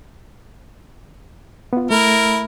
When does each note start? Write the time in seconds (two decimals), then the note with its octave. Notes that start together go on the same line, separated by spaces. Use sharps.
1.73 B3 F4
1.91 A3 E4 A#4